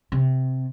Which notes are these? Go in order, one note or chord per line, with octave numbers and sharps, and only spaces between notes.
C3